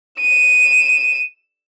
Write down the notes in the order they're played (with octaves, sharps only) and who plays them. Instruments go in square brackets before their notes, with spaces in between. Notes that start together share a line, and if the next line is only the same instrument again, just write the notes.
[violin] D#7 E7